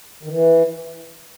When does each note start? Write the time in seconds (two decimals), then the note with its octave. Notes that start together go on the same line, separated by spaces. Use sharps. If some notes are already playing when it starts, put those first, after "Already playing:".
0.23 D#3
0.29 E3